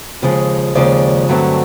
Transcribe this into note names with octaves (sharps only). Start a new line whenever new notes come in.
D#2 C#3 F3 G#3
D#2 C#3 F3 G#3 D5
G2 D3 F#3 A3 C4